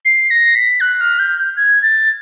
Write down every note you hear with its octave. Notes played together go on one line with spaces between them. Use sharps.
C7
A#6
B6
F#6
F6
G6
G#6
A6